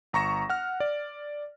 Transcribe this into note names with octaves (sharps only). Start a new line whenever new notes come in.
G1 A#5 C#6 A#6 E7
F#5 F6
D5